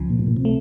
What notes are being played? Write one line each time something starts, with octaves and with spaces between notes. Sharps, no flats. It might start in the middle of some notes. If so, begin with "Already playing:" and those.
Already playing: C#2 C#3 F3
A#2
A2
A#2
C3
A3